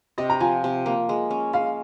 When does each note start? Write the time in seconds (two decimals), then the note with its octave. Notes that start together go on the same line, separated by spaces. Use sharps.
0.18 C3 D#5
0.30 A#5
0.40 F3 G#5
0.64 C3
0.86 A#3
1.09 G#3
1.31 C#4
1.53 G#3 F5